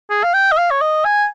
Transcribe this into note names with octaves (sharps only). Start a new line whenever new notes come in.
G#4
F5
G5
D#5
F5
C#5
D#5
G#5